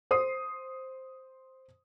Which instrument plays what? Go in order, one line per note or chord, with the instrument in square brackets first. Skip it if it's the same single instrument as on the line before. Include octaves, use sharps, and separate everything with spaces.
[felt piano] C5 D#6 C7